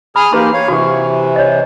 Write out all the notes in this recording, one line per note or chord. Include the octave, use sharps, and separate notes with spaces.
G#4 B5 D#6 F6
A#3 D#4 G4 B4 C6
C#5 F5
C3 E3 F#4 G4
C#5 D#5